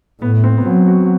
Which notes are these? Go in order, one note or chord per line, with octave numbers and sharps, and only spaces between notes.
A2 B3
C4
B3
F#3 C4
F#4